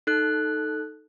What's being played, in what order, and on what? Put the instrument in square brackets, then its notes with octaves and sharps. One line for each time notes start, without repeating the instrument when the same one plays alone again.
[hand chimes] D#4 A4 F#6